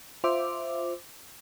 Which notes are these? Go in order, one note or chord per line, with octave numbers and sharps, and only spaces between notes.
F4 C5 E5 D6